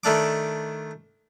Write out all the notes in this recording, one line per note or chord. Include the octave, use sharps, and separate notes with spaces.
D#3 A3 D4 D6